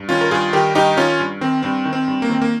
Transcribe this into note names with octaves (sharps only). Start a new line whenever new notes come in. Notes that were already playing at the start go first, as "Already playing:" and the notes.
Already playing: G2
D#3 C#4 F4
A#4
G2 F4 G#4
D#3 G4 A#4
G2 D#4 G4
D#3 C#4 F4
G2
D#3 C4
G2 C4
D#3
C4
G2
A#3
D#3 C4
A#3